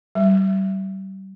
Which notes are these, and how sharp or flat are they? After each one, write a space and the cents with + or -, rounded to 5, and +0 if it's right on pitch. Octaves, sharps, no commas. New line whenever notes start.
G3 -30